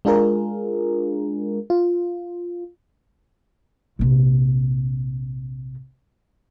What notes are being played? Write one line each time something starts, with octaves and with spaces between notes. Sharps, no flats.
G#3 D4 F4 G#4 A#4
F4
A#1 C3